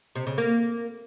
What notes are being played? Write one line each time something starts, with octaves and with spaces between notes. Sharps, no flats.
C3
C#3
A#3